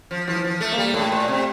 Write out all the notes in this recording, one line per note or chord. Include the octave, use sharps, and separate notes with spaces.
F3
E3 F3
F3
A3
A#3
G3
A2 A3
A#2
C3